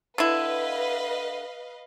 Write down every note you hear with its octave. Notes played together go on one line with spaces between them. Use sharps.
D3 E4 B4 D#5 F5